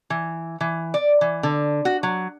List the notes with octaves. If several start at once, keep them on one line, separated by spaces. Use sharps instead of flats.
E3
E3
D5
E3
D3
F#4
F#3